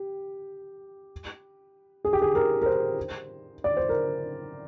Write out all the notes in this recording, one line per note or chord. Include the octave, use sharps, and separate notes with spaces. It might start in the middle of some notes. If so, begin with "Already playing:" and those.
Already playing: G4
G#4
G4
G#4
A#4
A#4
C5
D5
C5
A#4